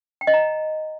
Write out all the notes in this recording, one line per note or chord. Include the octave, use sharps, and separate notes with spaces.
G5
D#5
A#5